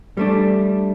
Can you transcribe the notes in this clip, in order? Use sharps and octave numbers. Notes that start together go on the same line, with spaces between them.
G3 A3 D4